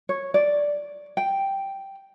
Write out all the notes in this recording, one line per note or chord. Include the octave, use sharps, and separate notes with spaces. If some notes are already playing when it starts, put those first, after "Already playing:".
C#5
D5
G5